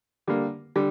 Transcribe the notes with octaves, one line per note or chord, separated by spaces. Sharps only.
D3 G3 A#3
D3 G3